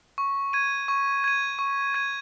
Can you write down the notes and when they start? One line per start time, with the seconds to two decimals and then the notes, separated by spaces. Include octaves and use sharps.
0.18 C#6
0.53 G#6 D#7
0.88 C#6
1.24 G#6 D#7
1.59 C#6
1.94 G#6 D#7